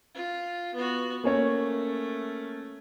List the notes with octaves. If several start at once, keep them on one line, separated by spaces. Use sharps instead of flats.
F4
B3 F#4
A3 A#3 C#4 C#5